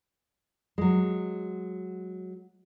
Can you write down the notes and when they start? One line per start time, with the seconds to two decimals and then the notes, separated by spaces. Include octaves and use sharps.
0.78 F#3 G#3